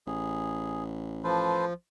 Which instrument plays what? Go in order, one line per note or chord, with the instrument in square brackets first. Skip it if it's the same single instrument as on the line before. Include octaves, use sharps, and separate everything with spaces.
[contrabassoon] A1 [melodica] G#4
[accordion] F3 [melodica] A4 B4 C5